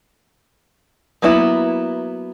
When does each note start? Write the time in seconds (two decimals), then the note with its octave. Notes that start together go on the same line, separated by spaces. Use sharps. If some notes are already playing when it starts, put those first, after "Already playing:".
1.22 F#3 A#3 B3 E4